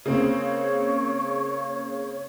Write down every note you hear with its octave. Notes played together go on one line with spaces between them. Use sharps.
C#3 A#3 C4 C#5